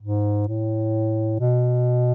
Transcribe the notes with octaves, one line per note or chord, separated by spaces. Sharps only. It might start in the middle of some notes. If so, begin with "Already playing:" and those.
G#2
A2
B2